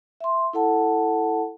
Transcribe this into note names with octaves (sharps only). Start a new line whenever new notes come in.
E5 C6
E4 A4 F#5 A5